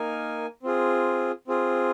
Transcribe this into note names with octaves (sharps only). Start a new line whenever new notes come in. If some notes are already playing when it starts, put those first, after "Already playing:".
Already playing: A#3 D#4 A#4 G#5
C4 F4 G#4
C4 F4 G#4